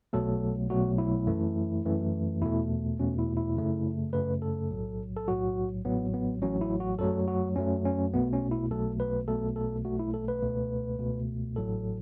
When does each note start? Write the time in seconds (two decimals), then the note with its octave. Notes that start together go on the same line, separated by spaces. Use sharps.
0.13 B1 B2 F#3 A3 A4
0.70 B1 B2 F#3 A3 F#4
0.98 E4
1.27 F#2 E3 A3
1.85 F#2 E3 A3
2.42 E2 B2 A3 E4
2.99 E2 B2 A3 C#4
3.18 E4
3.37 E4
3.56 F#2 C#3 A3
4.13 F#2 C#3 A3 B4
4.42 A4
4.71 B1 A2 F#3
5.17 A4
5.28 B1 A2 F#3 F#4
5.85 A1 A2 F#3 B3
6.14 B3
6.42 A1 A2 F#3 C#4
6.61 E4
6.80 F#4
6.99 F#2 F#3 A3 A4
7.28 F#4
7.56 F#2 F#3 A3 C#4
7.85 C#4
8.13 B1 B2 A3 B3
8.33 C#4
8.51 E4
8.70 B1 B2 A3 A4
9.00 B4
9.28 B1 B2 A3 A4
9.56 A4
9.85 B1 B2 A3 F#4
9.99 E4
10.14 A4
10.28 B4
10.42 C#2 B2 A3
10.99 C#2 B2 A3
11.56 A1 A2 F#3 A4